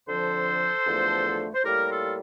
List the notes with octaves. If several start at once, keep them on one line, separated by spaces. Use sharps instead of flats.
F2 D3 F3 A4 C5
E2 D3 F3 A3
C5
A2 G3 A#3 G4 A#4
F4 A4